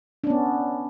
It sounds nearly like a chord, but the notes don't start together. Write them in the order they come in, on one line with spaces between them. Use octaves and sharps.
D4 C#4 B3